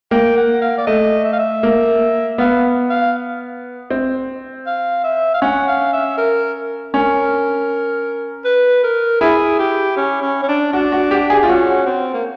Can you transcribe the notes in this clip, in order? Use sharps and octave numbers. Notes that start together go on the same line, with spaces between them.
A#3 G5
F#5
F5
D5
A3 D#5
E5
F5
E5
A#3
B3 F5
F5
C4
F5
E5
F5
C#4 F#5
F5
E5
A#4
C#4 A#4
B4
A#4
E4 G#4
G4
C#4
C#4
C#4
D4
D4 F#4
F#4
G4
G#4
F4
C#4 F#4
C4
A#3